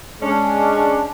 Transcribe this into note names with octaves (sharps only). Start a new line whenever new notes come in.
G#3 C#4 D4